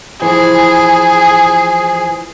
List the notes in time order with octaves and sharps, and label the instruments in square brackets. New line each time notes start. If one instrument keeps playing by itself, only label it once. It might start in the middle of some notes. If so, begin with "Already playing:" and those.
[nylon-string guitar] E3 F3 [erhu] G#4